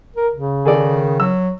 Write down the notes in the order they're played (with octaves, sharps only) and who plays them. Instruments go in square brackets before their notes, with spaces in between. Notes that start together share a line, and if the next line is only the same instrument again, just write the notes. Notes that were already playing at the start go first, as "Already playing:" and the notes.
[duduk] A#4
C#3
[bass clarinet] D#3 [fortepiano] G#4 A4 D5
[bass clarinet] F#3 [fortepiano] E6